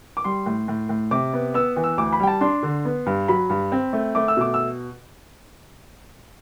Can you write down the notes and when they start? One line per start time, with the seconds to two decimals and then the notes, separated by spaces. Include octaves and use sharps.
0.17 D6
0.24 G3 C6
0.46 A2
0.68 A2
0.89 A2
1.11 C3 D6
1.33 B3
1.54 B3 E6
1.76 E3
1.84 E6
1.98 D2 D6
2.12 B5
2.20 G3 G5
2.27 A5
2.41 D4 C6
2.63 D3
2.85 B3
3.06 G2
3.28 F#3 B5
3.50 G2
3.72 C4
3.93 A3
4.15 A3 D6
4.28 E6
4.37 B2 D6
4.54 E6